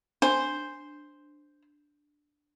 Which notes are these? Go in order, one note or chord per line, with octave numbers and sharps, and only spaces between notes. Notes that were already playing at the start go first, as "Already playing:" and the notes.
D4 C5